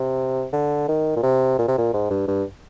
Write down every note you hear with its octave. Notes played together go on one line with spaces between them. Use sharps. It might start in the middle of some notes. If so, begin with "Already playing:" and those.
Already playing: C3
D3
D#3
A#2
C3
A#2
C3
A#2
G#2
G2
G2